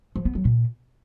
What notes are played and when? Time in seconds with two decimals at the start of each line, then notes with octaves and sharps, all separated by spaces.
0.16 F3
0.25 B3
0.35 F#3
0.45 A#2